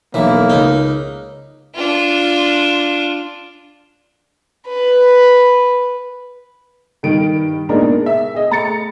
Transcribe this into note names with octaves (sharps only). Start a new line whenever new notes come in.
B1 E3 A#3
C#2 D#4
D4 F4
B4
G2 D#3 D7
A#2 G#3 B3 D4 D#4 A#4
E5
G#4 D#5
A3 A#5 A6 C#7